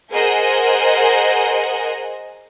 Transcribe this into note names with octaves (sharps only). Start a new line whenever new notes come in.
G#4 A#4 C5 D#5 F#5 G#5